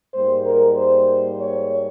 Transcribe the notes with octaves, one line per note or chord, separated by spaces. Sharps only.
G#2 G3 A#3 C5
A#4
C5
C#5